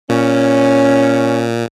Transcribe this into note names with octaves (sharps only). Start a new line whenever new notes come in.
A#2 C#4